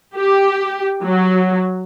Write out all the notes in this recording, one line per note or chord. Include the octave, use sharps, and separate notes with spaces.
G4
F#3